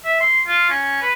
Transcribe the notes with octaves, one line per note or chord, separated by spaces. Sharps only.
E5
C6
F4
C#4
B4